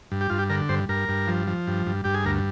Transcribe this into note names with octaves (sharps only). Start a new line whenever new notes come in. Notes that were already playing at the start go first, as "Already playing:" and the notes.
G2
G4
G2 F4
G4
D3 A#4
G2 C5
G2 A#4
G2
F3
F3
G2
G2
G2 G4
G#4
D2 A#4